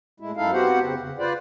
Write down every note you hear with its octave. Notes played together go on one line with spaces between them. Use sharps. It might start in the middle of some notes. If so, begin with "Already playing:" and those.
A2 G#3 E4
F#2 D#4 E4 A4 F5
B3 C4 F#4 G4 C5 F#5
F2 C#3 C4
C#3
F4 B4 C5 D5